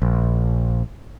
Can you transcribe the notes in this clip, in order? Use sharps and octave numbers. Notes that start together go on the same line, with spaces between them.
A#1